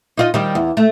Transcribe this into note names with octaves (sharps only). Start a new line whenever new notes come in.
D#4 F4 D#5
D#3 G3
E2
A3